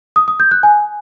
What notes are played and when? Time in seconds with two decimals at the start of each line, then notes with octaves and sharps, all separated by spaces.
0.16 D#6
0.28 D#6
0.40 G6
0.51 F#6
0.63 G#5